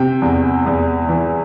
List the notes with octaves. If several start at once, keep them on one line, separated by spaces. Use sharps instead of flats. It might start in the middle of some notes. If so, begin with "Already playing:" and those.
Already playing: C3 G5
E2
E2
E3